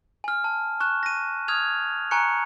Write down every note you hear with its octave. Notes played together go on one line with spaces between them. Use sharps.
G#5 F6
A5
C#6 F#6 E7
A#6 D#7
D#6 F6 G#6 F7
G#5 A#5 C#6 F#6 C#7